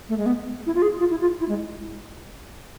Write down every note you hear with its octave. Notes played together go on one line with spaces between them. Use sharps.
A3
G#3
B3
E4
F4
G#4
F4
E4
F4
E4
G#3